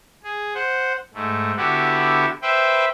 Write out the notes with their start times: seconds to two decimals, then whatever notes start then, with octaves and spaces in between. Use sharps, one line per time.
0.24 G#4
0.54 C5 F#5
1.14 G#2 A3
1.57 D3 B3 E4 F#4 G4
2.42 B4 C5 E5 G5